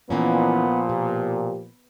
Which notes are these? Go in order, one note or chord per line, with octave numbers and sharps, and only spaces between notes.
A#2 E3 F3 A#3 B3 C#4
B2 G4